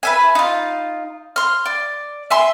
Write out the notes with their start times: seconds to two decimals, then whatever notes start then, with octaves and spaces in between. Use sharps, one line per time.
0.03 B4 E5 G#5
0.35 D#4 F4
1.36 C6 F6
1.66 D5
2.30 E5 G#5 C6